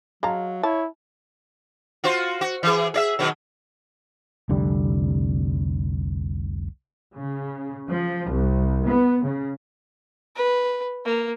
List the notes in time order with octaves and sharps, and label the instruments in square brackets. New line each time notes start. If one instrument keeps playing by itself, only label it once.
[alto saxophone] F#3 [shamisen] G#3 A5 A#5 [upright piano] F5
[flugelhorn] E4 [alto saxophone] C#5 [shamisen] A5
[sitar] F4 F#4 C5
F#4
E3 G#4
G#4 D5 E5
B2 D#3 F#3
[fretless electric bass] F1 C2 D3 G3
[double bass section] C#3
F3
C2
B3
C#3
[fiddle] B4
A#3